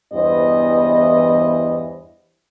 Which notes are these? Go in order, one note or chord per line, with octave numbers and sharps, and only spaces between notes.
E2 G2 E3 B3 C5 D#5